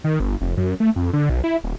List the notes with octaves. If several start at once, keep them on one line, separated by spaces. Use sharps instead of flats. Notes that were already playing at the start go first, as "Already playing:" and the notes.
D#3
G1
F1
F#2
A3
F2
D3
B1
E4
D#1